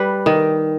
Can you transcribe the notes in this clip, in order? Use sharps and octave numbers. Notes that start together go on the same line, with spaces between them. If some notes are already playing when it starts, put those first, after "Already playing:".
Already playing: G3 B4
D#3